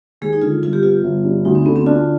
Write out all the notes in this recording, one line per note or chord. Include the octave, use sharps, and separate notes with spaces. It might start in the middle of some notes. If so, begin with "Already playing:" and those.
D#2 G#3 G#4
D#4
D3 F4
G1 F4
G4
B3 F4
G1
G2
D2 D#4
C4
D3 B3
C4
D4 F4